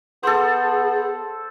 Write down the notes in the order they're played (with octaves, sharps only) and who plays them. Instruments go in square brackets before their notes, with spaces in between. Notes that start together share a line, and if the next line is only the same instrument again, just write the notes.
[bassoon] B3 [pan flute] G#4 [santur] A4 C5